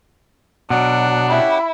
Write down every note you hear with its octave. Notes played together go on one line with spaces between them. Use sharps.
B2 F#3 D4 F#5
C#4 E4 G4 F#5